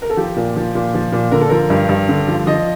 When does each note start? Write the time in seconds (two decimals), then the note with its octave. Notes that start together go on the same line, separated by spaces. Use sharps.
0.02 A#4
0.10 A4
0.17 F3 G4
0.36 A#2
0.56 F3
0.75 A#2
0.94 F3
1.12 A#2
1.31 D3 A#4
1.41 A4
1.49 F3 A#4
1.70 G2
1.89 G2
2.09 D3
2.28 F3
2.46 F3 D#5